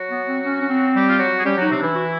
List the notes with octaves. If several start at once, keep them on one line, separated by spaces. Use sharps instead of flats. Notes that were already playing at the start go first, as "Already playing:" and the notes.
Already playing: F#3 F#4
B3
C4
C#4
C#4
C4
G3 G4
F4
F#3 F#4
G#4
G3 C#4 G4
F#3 D#4 F#4
C3 C4
E3 D4 E4
F#4